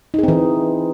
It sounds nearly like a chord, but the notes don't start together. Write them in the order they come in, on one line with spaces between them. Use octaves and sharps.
D#4 G#4 C4 E3